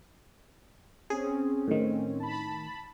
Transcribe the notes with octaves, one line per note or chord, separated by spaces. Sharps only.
C4 C#4 G#4
A2 D#3
A5 B5